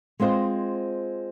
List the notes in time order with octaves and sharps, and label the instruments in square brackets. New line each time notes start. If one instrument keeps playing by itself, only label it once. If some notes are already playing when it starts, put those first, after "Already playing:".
[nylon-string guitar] G#3 C4 F4 C5 D#5